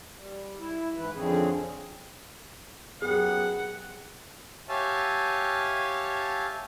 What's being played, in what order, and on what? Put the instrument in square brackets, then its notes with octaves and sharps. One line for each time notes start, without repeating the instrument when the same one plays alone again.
[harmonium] G3
E4
G#2 E3 B4
F2 D3 F3 C4 C#4 G#4
[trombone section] F#2 B3 G4 [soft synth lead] G#4 [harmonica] F#5
[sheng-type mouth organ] G4 C#5 E5 F5 G#5 A5